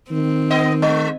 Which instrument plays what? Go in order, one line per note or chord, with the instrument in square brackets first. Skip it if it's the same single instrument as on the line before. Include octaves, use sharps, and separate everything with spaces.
[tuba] D#3 [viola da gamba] C4
[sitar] B3 D#5
[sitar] G#3 [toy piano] D#5